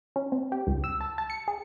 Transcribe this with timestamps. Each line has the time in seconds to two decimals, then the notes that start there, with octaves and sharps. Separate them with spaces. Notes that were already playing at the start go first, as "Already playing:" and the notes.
0.16 C#4
0.32 C4
0.52 G4
0.67 C#2
0.84 E6
1.01 A5
1.18 A5
1.30 C#7
1.48 G#4